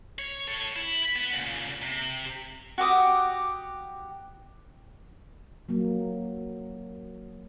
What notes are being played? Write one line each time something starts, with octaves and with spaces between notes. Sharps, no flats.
C#5
A4 C#5
E4
B3
A#2 C#3
C3
F#4 G4 D6 D#6
F#3 A#3